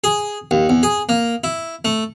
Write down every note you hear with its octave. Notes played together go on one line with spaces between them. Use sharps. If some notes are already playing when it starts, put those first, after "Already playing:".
G#4
D#2
E2
G#4
A#3
E4
A3